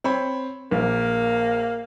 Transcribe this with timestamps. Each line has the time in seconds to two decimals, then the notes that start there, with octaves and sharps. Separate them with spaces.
0.04 C4 C#5 B5
0.71 A#1 A#3